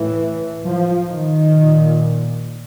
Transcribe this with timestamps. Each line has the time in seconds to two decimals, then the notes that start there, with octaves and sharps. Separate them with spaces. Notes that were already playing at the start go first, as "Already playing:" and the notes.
Already playing: A2 E3
0.65 F3
1.10 D#3
1.55 A#2